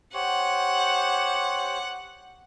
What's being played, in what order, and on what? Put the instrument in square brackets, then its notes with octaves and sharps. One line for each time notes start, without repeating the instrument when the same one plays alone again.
[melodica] G4 C5 C#5 [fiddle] F#5